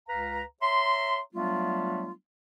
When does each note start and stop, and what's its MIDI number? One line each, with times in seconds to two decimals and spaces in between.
0.08 0.42 37
0.08 0.42 71
0.08 0.42 77
0.08 0.42 82
0.61 1.19 73
0.61 1.19 76
0.61 1.19 82
0.61 1.19 84
1.34 2.11 54
1.34 2.11 55
1.34 2.11 57
1.34 2.11 59
1.34 2.11 62
1.34 2.11 65